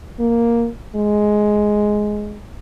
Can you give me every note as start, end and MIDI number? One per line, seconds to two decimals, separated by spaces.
0.19 0.68 58
0.96 2.42 56